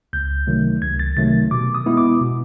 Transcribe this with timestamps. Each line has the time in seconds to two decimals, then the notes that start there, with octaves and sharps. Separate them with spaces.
0.13 C#2 G6
0.47 C3 D#3 F#3 A3
0.82 C#2 G#6
0.99 A6
1.16 C3 D#3 F#3 A3 A6
1.51 B2 D6
1.75 D#6
1.86 G#3 B3 E4
1.97 D6
2.21 B2